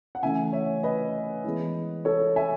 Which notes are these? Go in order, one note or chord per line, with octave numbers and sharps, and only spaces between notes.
F#5
C#3 E3 A3 C#4 E5 G#5
C#5 E5
B4 D#5
E3 G#3 B3
A4 C#5
E5 G#5